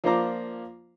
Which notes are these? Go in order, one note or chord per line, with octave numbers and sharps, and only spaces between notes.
F3 A#3 D4 C5 A#5 D6